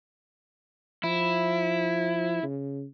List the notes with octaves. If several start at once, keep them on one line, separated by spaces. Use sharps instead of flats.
F3 E4
C#3